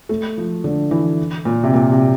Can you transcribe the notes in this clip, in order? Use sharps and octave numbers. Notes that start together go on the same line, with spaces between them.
A3
F3
D3
E3
A#2
C3
A#2
C3